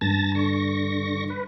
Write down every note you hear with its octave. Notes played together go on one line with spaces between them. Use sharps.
G2 A5 A6 A#6
D3 C#6 A#6
B4